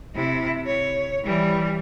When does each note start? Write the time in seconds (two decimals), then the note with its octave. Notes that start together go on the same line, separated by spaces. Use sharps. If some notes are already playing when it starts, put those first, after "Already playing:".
0.15 C3 E4
0.66 C#5
1.25 E3 G3